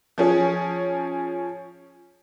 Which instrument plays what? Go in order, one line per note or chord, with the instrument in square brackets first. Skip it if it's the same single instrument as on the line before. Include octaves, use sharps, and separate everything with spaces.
[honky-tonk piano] F3 C#4 G#4